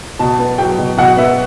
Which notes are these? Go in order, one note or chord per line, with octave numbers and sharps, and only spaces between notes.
B2 A5
B3
F#3 G5
B2
B2 F#5
B3 E5